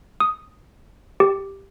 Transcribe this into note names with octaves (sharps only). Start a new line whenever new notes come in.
D#6
G4